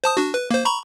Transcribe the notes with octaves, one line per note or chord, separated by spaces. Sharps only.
C5 A5 D#6
D4 F#4
B4
A#3 C5
A#5 B5 C#6